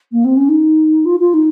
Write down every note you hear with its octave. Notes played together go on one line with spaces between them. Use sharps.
A#3
C4
C#4
D#4
F4
F4
D#4